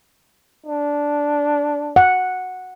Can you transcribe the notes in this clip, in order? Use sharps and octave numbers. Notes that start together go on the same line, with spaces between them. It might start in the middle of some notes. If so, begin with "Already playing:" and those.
D4
F#5